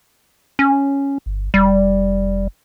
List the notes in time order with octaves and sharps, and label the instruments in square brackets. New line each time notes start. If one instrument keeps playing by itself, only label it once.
[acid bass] C#4
[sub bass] G1
[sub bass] F1 [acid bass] G3